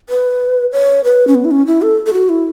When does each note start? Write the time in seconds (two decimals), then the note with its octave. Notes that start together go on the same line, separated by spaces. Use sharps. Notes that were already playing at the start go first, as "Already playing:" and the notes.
0.09 B4
0.72 C#5
1.04 B4
1.27 C#4
1.35 B3
1.45 E4
1.51 C#4
1.67 E4
1.82 A4
2.06 A4
2.13 F#4
2.29 E4